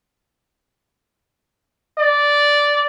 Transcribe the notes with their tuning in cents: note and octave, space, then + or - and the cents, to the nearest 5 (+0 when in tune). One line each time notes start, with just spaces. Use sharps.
D5 -10